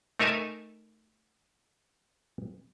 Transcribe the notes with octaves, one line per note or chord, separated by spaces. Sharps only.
A3 D#4 A#4 E5 G#5 A5